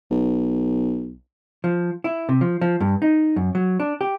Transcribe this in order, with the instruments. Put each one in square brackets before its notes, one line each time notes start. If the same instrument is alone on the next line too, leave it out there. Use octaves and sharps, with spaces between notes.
[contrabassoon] B1
[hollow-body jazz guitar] F3
E4
C3
F3
F3
G2
D#4
F#2
F#3
D4
G4